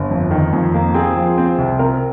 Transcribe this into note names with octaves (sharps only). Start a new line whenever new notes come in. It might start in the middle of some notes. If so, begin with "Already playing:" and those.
Already playing: G1
F2
D#3
F2
A#3
C4 G#4
F3
C4
C2
C4 A#4